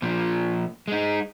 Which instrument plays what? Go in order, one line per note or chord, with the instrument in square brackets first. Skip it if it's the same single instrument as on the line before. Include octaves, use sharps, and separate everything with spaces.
[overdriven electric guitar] A#2 F3
G#3 D#4